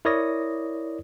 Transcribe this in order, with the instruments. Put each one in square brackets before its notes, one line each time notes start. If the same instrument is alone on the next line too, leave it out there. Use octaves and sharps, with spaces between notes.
[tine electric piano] E4 A#4 C#5 D5 D#6 A#6